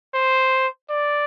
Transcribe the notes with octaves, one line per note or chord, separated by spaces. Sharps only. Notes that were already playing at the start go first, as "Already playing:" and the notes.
C5
D5